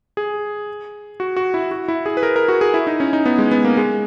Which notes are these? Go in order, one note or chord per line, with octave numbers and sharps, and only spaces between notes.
G#4
F#4
F#4
E4
F#4
E4
G#4
B4
A#4
A#4
F#4
G#4
E4
D#4
C#4
D#4
B3
G#3
B3
A#3
G#3